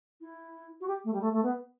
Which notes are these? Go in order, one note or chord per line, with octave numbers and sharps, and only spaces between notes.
E4
F#4
G4
A3
G3
A3
A3
B3